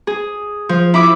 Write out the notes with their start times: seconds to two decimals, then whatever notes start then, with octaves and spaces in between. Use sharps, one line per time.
0.07 G#4
0.69 F3
0.94 E4 B5 D6